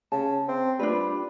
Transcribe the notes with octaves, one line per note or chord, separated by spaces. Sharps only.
C#3 A5
C4
G3 D4 F4 B4